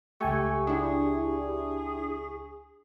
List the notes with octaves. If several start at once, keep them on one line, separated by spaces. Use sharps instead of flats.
C#2 A3 G4 G#5 C#6
D4 E4 G4 G#4